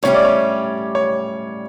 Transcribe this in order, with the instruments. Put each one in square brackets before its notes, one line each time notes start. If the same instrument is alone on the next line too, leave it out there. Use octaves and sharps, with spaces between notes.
[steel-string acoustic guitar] A2 G3 C#4 G4 [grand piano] C#5
[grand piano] D5
C#5
C#5